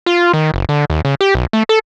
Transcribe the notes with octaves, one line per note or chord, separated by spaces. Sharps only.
F4
D#3
F#1
D3
D#2
C#3
G4
B1
A3
A4